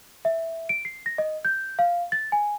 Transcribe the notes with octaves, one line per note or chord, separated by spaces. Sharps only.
E5
D7
C7
A#6
D#5
G6
F5
A6
G#5